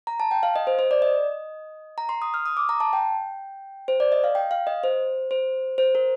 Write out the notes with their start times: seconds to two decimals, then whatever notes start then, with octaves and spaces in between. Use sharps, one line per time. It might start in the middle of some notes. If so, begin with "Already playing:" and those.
0.07 A#5
0.20 A5
0.31 G5
0.43 F5
0.56 D#5
0.67 C5
0.79 C5
0.91 D5
1.02 D#5
1.98 A#5
2.09 C6
2.22 D#6
2.34 F6
2.46 D#6
2.57 D6
2.69 A#5
2.80 A5
2.93 G5
3.88 C5
4.00 D5
4.12 D#5
4.24 F5
4.35 G5
4.51 F5
4.67 D#5
4.83 C5
5.31 C5
5.78 C5
5.95 A#4